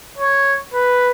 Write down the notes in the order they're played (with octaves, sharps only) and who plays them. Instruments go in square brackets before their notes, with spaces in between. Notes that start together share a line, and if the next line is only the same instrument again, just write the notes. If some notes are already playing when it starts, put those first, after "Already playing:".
[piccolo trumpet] C#5
B4